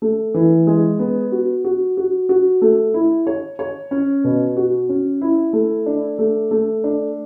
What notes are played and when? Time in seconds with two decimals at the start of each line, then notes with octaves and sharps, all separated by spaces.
0.02 A3
0.34 E3
0.67 G#3
0.99 B3
1.32 F#4
1.65 F#4
1.97 F#4
2.29 F#4
2.62 A3
2.94 E4
3.27 C#5
3.59 C#5
3.91 C#4
4.24 B2
4.57 F#4
4.89 C#4
5.22 E4
5.53 A3
5.86 D4
6.19 A3
6.51 A3
6.84 D4